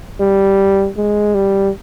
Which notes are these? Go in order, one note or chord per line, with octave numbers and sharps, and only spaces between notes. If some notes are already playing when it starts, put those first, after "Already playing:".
G3
G#3
G3